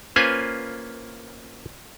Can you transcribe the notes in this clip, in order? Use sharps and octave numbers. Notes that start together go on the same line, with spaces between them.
A#3 C#4 F4 B4 C5 G#5